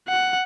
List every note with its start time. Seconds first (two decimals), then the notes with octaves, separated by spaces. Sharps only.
0.08 F#5